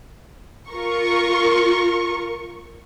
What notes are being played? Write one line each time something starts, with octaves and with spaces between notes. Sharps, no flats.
F4 A#4 C#6